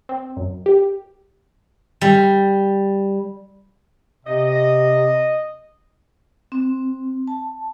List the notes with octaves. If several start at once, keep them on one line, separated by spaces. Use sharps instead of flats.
C4
F#2
G4
G3
C3 D#5
C4
A5